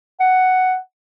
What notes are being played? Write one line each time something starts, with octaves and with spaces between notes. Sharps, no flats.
F#5